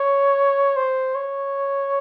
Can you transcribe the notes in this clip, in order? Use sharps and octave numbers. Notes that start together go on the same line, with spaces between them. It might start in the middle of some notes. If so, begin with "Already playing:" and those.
Already playing: C#5
C5
C#5